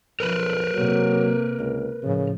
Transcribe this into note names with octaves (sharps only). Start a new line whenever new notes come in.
B1 F3 A#4 B4
C3 F#3 A#3
C#2
A2 C#3 F3